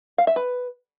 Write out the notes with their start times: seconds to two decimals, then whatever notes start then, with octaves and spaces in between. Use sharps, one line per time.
0.18 F5
0.27 E5
0.36 B4